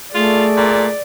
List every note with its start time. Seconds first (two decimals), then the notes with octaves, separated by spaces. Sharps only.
0.15 A3 F4 G#4 D5
0.57 A#2